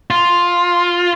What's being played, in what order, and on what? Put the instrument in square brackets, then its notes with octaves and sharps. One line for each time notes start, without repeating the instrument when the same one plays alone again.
[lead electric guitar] F4